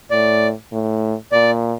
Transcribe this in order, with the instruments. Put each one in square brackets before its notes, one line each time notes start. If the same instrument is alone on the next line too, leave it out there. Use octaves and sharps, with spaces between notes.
[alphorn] A2 [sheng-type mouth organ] D5
[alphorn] A2
[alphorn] A#2 [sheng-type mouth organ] D5